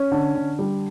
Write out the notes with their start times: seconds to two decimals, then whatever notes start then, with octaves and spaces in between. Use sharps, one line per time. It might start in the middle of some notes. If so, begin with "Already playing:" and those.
Already playing: C#4
0.12 D3
0.35 D3
0.59 G3